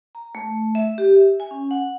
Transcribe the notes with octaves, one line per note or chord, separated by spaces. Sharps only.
A#5
A3
E5
G4
E5
G#5
C#4
F#5